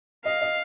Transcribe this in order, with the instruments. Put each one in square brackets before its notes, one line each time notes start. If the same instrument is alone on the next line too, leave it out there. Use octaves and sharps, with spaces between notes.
[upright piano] D#5 [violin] F5
[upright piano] D#5